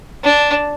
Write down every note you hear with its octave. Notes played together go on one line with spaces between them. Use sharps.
D4